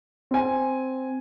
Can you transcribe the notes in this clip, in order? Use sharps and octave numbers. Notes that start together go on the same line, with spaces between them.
C4 G#5